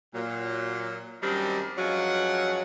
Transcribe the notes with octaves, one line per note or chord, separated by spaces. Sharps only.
A#2 F#3
F#2 D#3 G3 C4 D4 D#4
G2 F3 F#3 G#3 C#4 F#5